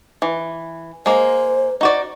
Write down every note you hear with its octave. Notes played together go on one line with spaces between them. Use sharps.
E3
G#3 A#3 C5
D#4 F#4 D5